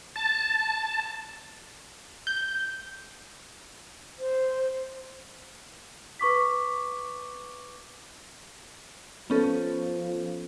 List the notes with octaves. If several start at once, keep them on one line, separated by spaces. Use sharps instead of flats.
A5
G6
C5
B4 C#6 D6 B6
F3 B3 C#4 A4